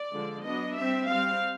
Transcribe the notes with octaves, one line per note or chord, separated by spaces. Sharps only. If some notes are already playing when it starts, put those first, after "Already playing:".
Already playing: D5
D3 F3 G#3
F#3 B3 D4 D#5
G3 C4 E5
G3 C4 F5